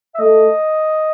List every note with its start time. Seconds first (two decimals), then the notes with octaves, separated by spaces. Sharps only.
0.14 E5
0.19 A3 D#5